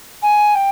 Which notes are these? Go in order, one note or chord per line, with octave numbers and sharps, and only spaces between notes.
G#5
G5